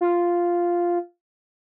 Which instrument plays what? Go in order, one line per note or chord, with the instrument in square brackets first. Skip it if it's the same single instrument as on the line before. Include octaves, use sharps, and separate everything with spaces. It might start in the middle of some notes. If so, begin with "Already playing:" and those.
[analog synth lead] F4